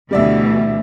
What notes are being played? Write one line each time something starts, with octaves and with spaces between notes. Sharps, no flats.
D2 B2 E3 G3 D5 E5